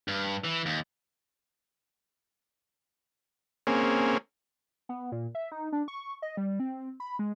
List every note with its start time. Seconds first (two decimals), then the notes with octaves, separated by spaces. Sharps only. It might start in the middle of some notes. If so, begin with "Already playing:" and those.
0.08 G2
0.44 E3
0.66 D#2
3.67 A#3 C4 C#4 G#4
4.89 B3
5.12 A#2
5.35 E5
5.52 D#4
5.72 D4
5.88 C#6
6.22 D#5
6.37 G3
6.60 C4
7.00 B5
7.19 G#3